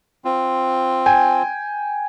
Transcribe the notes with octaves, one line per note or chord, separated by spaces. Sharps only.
C4 F4
G5 G#5